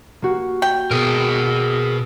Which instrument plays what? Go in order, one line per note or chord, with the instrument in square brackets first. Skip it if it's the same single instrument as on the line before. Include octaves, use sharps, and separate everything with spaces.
[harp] A#3 F#4
[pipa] G5
[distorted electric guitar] B2 [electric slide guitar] G#4 A#4